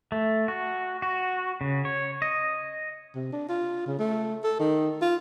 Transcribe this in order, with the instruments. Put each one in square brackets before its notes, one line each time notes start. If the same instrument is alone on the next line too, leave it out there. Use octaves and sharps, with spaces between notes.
[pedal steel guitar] A3
F#4
F#4
C#3
C#5
D#5
[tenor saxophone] C3
D4
F4
C#3
A3
A4
D#3
F4